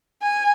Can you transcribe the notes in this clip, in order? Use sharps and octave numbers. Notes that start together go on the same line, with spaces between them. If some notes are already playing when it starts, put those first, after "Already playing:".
G#5